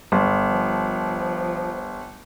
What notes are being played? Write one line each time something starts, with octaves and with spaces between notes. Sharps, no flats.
G1
F3